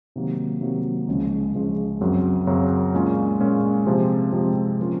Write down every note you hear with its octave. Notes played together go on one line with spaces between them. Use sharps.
C3 D#3 F#3 A#3
C3 D#3 F#3 A#3
C#2 C#3 F3 G#3 C#4
C#2 C#3 F3 G#3 C#4
F#2 C#3 F#3 C4
F#2 C#3 F#3 C4
A#2 G#3 C#4 F4
A#2 G#3 C#4 F4
C3 F3 G#3 C4
C3 F3 G#3 C4
A#2 F3 A#3 C#4 F4